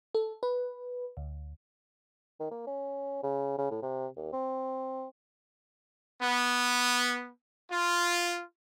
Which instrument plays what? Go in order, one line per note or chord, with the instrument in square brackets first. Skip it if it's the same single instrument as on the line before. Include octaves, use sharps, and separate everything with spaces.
[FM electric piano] A4
B4
D2
[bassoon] D#3
A#3
C#4
C#3
C#3
A2
C3
D#2
C4
[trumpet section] B3
F4